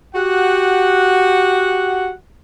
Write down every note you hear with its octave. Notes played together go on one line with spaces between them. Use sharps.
F#4 G4 F#5